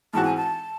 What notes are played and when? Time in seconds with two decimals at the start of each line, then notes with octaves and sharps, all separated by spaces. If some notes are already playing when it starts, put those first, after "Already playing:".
0.14 G#2 E3 C4 F#4 A5
0.24 G#5
0.37 A5